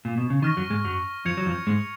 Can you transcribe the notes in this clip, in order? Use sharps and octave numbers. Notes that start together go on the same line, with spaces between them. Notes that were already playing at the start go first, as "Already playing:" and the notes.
A#2
B2
C#3
D#3 C#6 F6 A#6
F#2 F#3
G#2 G#3
F#2 F#3
F2 F3 G#6 C#7 F7
F#3
F2 F3
G#2 G#3